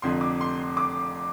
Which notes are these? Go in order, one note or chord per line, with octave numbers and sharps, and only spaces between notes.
F1 F2 D3 F3 C6
D6
C6
C6
D6